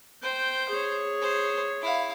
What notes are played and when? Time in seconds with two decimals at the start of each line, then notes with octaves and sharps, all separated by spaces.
0.23 C5 G5
0.69 G#4 C#5
1.21 C5
1.82 E4 F5